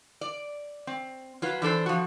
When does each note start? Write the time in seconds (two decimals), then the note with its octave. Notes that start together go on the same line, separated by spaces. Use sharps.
0.21 D5
0.87 C4
1.42 F#3 F4 B4
1.62 E3 D4 A4 C5
1.86 F3 F#4